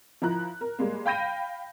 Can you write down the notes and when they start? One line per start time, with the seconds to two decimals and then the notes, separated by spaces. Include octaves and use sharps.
0.22 F3 E4 A#5 F#6
0.61 A#4
0.79 G3 G#3 A#3
1.06 F5 G5 B5 G6 A#6 D#7